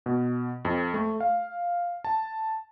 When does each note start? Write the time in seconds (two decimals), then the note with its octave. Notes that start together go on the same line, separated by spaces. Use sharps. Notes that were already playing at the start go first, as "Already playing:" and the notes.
0.06 B2
0.65 F2
0.94 A3
1.20 F5
2.04 A5